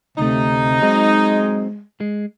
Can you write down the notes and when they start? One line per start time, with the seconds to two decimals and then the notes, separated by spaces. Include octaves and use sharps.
0.18 D2 C3 A3 D#4
0.82 F#3 G#3 C4
2.00 G#3